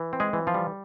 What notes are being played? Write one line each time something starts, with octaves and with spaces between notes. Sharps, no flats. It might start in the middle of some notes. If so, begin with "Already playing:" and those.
Already playing: E3
C4
G#3 G#4
E3
F3 F4
G3